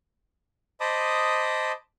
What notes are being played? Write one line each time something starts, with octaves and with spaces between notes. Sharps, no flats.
C5 D#5 A5 B5 D6 D#6